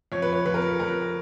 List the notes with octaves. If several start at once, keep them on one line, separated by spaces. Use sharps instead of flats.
F2 C#5
B4
C#5
F2 B4
A#4
B4
F2 A#4